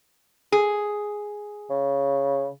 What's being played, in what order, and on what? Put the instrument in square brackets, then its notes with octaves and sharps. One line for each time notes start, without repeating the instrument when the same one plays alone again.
[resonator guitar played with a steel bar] G#4
[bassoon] C#3